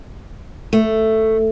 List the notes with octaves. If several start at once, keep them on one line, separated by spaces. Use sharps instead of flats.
A3